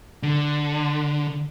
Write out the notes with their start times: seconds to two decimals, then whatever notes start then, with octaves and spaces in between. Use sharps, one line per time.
0.23 D3